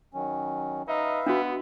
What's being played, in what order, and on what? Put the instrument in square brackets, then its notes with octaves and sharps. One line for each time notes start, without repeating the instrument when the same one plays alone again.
[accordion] D#3 F#3 C#4
[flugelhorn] D#4 [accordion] B4 E5 F5
[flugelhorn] B3 [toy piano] D4 F#4